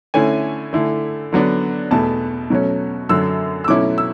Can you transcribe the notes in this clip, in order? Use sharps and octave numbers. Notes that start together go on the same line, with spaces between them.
D3 A3 C#4 E4 G#5
D3 A3 E4
D3 F#3 B3 D4
E2 B2 A3 A5
B2 F#3 A3 C#4
F#2 D3 F#3 E6
E6
B2 F#3 A3 C#4 E4 D6
E6